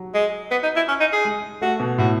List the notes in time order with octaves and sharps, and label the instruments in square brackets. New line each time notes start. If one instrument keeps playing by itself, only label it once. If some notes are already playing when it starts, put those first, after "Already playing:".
Already playing: [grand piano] F#3
[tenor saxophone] G#3
B3
D#4
E4
C#4
D#4
G#4
[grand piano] G#3
[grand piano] A3 [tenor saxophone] F#4
[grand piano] B2
[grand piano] A2 [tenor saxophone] F#4